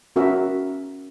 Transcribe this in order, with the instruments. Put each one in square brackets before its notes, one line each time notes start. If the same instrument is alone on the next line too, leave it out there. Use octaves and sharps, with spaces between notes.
[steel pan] C#4 F#4 A#4 E5